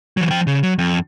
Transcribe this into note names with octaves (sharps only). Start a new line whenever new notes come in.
E3 F#3
F3 G5
C#3
F#3
F2